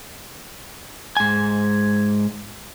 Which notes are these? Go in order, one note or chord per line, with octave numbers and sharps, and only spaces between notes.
G#2 G#5